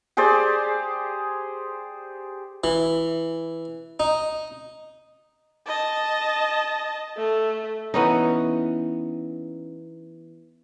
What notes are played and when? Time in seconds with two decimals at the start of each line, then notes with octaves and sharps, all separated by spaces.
0.17 G4 G#4 C5 D5
2.64 E3
4.00 D#4
5.67 D#5 A5
7.17 A3
7.94 E3 B3 C#4 D#4